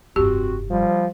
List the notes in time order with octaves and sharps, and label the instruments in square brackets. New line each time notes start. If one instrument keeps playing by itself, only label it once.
[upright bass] F1 G2 [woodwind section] C4 F#4 [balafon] G4
[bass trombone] F3 [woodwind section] G3